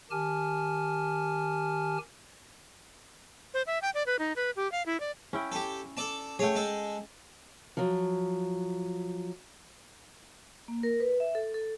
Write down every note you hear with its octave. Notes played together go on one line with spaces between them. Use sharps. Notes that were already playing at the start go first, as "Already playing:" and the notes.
D#3 G4 G#5 A5 F6
C5
E5
G5
D5
B4
D#4
B4
G4
F5
E4
D5
C#4 E4 G5
G4 A4
A4 D5 A5
A3 G#4 C#5 G5
G#3 A4
F3 F#3
A#3
A#4
B4
E5
A4
A4